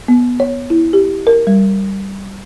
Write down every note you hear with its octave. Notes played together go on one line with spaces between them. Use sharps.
B3
C#5
E4
G4
A#4
G3